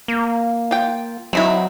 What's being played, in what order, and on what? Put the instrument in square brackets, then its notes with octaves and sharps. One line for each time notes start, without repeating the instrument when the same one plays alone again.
[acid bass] A#3
[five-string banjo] F4 G5
[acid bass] F#3 [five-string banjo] C4 D#4 E4